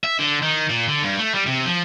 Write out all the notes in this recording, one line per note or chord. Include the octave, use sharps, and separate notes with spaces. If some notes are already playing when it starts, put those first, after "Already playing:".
E5
D3
D#3
A#2
D3
G2
A3
G3
C3
F3